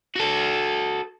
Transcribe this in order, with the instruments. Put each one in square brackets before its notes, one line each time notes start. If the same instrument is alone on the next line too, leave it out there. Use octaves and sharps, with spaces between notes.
[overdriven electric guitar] F#4 A4